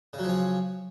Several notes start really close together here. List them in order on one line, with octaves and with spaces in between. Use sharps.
C#3 F#3 F3 C#4